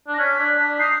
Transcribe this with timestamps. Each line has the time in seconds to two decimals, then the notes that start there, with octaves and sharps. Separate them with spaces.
0.08 D4
0.13 A#6
0.19 C#4 B6
0.39 D4
0.58 D4
0.79 D#4 C7